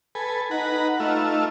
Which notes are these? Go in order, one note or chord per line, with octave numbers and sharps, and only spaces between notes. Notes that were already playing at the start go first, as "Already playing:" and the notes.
A4 B4 G#5
D#4 B4 F#5 A#5
A3 D#4 F4 E5